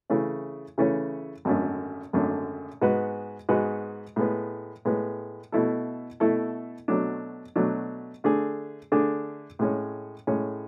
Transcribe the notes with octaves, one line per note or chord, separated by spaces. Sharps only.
C#3 E3 A3 C#4
C#3 E3 A3 C#4
G#1 F#2 D3 A3
G#1 F#2 D3 A3
G#2 G#3 B3 F#4 B4
G#2 G#3 B3 F#4 B4
A2 G#3 B3
A2 G#3 B3
B2 A3 E4 A4
B2 A3 E4 A4
B2 F#3 A3 D4
B2 F#3 A3 D4
D3 A3 D4 G#4
D3 A3 D4 G#4
A2 G#3 C#4
A2 G#3 C#4